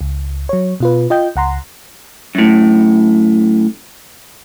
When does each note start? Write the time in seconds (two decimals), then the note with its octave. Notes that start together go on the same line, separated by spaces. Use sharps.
0.01 C#2
0.49 F#3 C#5
0.80 B2 F4 B4
1.10 F4 D#5 G5 G6
1.36 C#2 F#5 A#5 C6
2.35 F#2 A2